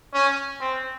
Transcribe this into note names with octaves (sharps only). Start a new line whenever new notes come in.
C#4
C4